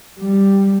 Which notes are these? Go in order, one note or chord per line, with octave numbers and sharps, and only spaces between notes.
G3